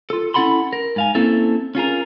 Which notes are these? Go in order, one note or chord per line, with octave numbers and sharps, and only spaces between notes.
F4 A4
C#4 E4 A4 F#5 B5 C6
A#4
G#2 F5 G#5
A#3 C4 C#4 E4 A4 E5
C#4 F4 G#4 A#4